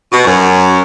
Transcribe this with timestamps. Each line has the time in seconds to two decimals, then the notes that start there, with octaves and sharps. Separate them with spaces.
0.12 B2
0.25 F#2